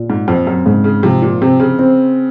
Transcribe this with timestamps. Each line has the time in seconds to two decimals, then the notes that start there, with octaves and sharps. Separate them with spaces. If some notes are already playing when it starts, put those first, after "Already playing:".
Already playing: A#2
0.10 G#2
0.28 F2 C4
0.47 F#2
0.66 G#2 C#3
0.84 C#3
1.03 C3 F3
1.22 A#2
1.41 C3 C4
1.60 C#3
1.79 C4